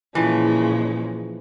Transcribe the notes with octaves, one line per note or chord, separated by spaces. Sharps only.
A#2 C#3 E3 F3 G#3